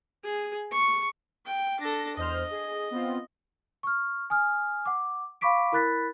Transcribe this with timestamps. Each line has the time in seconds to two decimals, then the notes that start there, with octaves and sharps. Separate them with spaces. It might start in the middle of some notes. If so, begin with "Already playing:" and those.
0.24 G#4
0.71 C#6
1.46 G5
1.80 D4 A4 A#6
2.17 E2 C5 D#5 F6
2.51 G#4
2.91 B3 C4 F4
3.83 C#6 F6
4.30 G#5 D#6 F6
4.86 F#5 D6
5.41 F5 B5 C#6 D6 B6 D7
5.72 E4 A#4 B5 F#6 A6 B6